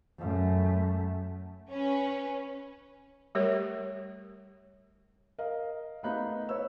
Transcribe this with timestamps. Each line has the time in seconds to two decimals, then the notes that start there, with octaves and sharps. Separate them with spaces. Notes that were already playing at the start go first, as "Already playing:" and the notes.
0.19 F#2 A3
1.70 C#4 B4
3.35 G3 A3 G4 A#4 C#5
5.38 A#4 D#5 F5
6.03 A3 B3 D#4 F5 B5 F#6
6.49 B4 C#5 E6